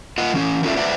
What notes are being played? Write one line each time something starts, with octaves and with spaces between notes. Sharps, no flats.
F4 D#5 F#5
E3 C#4
A3 C#4 F4 A4 D5 E5
B4 C5 D5 E5 F#5